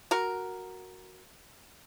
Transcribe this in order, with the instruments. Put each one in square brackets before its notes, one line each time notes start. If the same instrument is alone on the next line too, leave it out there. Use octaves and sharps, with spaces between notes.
[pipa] F#4 A#4